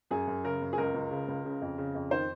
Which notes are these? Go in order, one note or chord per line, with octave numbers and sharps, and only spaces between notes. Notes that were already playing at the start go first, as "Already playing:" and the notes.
F#2 G#4
F#2
C#3 A#4
F#2
G#4
C#2 A#4
C#2
C#3
C#2
C#3
F2
C#3
F2
D#3 C5